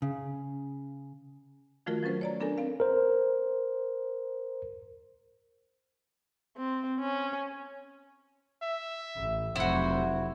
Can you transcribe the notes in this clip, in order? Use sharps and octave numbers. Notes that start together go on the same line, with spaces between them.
C#3
D#3 F3 A3 F4 F#4 A#4
F3 F#3 C#4 B4 C5
C#5 D5 A#5
B3 D4 A4 A#4 G#5
C4 F5
A#4 C5
C4
C#4
E5
A1
F1 F#3 E4 F#4 C5